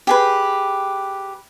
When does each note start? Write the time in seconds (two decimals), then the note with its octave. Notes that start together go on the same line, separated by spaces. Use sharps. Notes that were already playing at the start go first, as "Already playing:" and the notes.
0.07 G4 G#4 B4